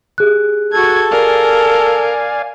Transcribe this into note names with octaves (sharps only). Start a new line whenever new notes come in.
G4 G#4 F#6
F#4 A4 G#6
A#4 D5 F5 G#5